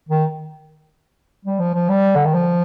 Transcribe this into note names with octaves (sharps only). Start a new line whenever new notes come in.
D#3
G3
F3
F3
G3
D3
D#3
F3